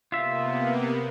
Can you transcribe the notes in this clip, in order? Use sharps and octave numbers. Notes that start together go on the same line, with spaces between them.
C3 A#3 B3 F4 E5